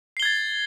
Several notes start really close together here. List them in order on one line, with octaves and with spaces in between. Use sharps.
C7 G7 G#6 A6